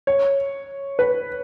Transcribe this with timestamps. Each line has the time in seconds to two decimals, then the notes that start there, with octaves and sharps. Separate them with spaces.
0.07 C#5
0.99 B4